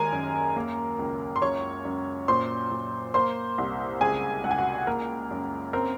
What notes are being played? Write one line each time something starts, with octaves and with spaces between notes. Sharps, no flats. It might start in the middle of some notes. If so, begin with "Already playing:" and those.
Already playing: D#2 G#3 A#4 G#5 A#5
F#2
A#3
C#2
C6
F#2 C#5 C#6
F#2
A#2 C5 C6
A#2
A#3 C5 C6
C2
C#2 G#4 G#5
C#2 F#5
G#5
F#4 F#5
A#3 A#4
F#2
C4 A#4